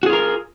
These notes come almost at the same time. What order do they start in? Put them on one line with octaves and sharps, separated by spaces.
F#4 G#4 F4 A#4